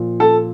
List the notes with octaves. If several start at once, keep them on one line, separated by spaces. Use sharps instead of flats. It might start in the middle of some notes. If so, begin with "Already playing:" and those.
Already playing: A#2 F3
A4 A5